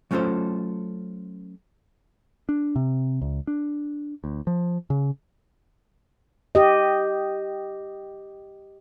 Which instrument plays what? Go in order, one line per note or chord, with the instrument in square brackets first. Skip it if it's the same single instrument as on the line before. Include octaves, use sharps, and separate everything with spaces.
[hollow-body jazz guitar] F#3 A3 C#4 F4 A4 C5
[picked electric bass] D4
C3
C#2
D4
D2
F3
C#3
[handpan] G4 D#5